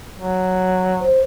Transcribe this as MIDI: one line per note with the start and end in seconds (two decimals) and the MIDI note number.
0.19 1.05 54
1.01 1.22 72